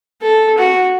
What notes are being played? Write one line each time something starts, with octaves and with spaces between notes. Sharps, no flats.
A4
F#4